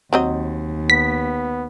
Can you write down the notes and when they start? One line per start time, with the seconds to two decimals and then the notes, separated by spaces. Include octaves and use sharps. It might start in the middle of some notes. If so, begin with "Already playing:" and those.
0.13 D#2 F#3 C4 D#5
0.90 B3 B6